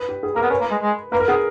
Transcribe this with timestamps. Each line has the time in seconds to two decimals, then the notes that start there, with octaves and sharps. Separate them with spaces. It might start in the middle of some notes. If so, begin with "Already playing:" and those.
Already playing: B4
0.09 G4
0.23 G#4
0.35 A#3 A#4
0.42 B3
0.50 C#4 B4
0.60 A#3
0.71 G#3
0.82 G#3
1.12 A#3 B4
1.20 A#4
1.28 B3 G#4